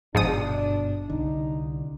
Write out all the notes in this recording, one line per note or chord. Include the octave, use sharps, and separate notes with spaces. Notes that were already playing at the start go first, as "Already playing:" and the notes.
G1 G#2 B2 F3 D4 D#6
C2 D3 D#4